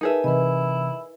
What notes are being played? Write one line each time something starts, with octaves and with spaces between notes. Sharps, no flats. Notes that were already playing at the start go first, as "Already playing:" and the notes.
D#4 G#4 A#4 B4 E5 A5
C3 E3 E4 B4 D#5